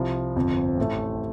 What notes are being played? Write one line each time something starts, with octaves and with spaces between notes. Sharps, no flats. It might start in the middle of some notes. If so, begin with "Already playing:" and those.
Already playing: C2 C3 F3
G1 F2 F3 C4
A1 A2 A3